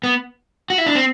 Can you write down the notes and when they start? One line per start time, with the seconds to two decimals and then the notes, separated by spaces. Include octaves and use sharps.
0.03 B3
0.70 F#4
0.78 E4
0.86 D4
0.95 C4